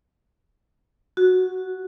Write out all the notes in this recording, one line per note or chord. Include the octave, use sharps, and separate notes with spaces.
F#4